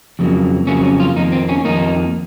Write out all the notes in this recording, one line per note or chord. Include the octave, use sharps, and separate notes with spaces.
F2 C#3 F#3 A#3
F2 C#3 F#3 A#3 C#4
C#4
F4
F2 D#3 A#3 D#4
C4
C#4
F2 D#3 A#3 D#4